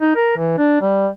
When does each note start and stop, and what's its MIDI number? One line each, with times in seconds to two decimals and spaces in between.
0.01 0.14 63
0.16 0.33 70
0.37 0.56 52
0.58 0.78 62
0.81 1.08 55